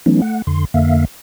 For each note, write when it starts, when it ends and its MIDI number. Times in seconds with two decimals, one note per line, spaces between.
0.06 0.21 52
0.06 0.21 54
0.06 0.21 57
0.06 0.21 59
0.06 0.21 61
0.06 0.21 63
0.22 0.42 57
0.22 0.42 78
0.47 0.65 41
0.47 0.65 50
0.47 0.65 84
0.74 1.05 41
0.74 1.05 50
0.74 1.05 58
0.74 1.05 76
0.74 1.05 77